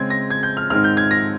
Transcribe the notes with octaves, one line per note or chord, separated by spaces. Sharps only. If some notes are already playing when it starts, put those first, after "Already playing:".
Already playing: C#3 G#3 C4 G#6
A#6
G#6
G6
F6
G#2 D#3 G#3 C4 F6
G6
G#6
A#6